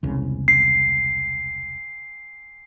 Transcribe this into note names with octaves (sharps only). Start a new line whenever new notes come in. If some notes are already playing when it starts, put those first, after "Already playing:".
E1 C2 C#3
C7